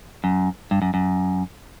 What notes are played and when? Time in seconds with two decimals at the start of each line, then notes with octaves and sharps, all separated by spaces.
0.24 F#2
0.71 G2
0.82 F#2
0.94 F#2